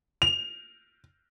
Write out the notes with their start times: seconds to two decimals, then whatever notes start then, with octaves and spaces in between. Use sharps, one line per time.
0.22 F7